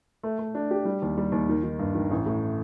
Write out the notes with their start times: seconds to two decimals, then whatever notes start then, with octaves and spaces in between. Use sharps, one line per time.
0.23 A3
0.39 A3
0.55 D4
0.71 G4
0.85 G3
1.02 D#2
1.18 G3
1.32 D#2
1.49 D#3
1.63 D#3
1.79 G2
1.95 D#3
2.11 A1
2.26 A2